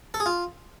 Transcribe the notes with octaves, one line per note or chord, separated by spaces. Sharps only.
A4
G#4
F4